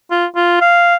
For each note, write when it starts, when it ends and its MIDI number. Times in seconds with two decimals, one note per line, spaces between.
0.11 0.26 65
0.35 0.57 65
0.61 0.95 77